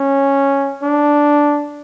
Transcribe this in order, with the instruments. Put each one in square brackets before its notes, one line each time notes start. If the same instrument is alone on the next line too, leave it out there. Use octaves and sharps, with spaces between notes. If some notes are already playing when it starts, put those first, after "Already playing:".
Already playing: [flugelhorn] C#4
D4